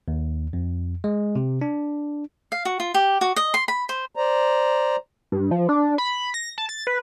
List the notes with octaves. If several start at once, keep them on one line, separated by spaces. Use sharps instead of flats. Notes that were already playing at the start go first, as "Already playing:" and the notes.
D#2
F2
G#3
C3
D4
F5
F#4
F4
G4
F#4
D#5
C6
B5
C5
C5 D5 A#5
G2
F3
D4
B5
A#6
A5
A6
B4